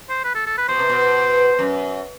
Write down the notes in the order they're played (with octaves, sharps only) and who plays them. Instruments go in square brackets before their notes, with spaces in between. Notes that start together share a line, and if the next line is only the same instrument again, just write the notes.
[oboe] C5
B4
A4
A4
B4
[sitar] B2 [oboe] C5
[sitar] C3
B2
F#2